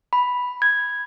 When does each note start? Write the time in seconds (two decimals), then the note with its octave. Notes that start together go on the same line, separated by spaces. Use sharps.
0.13 B5
0.62 G#6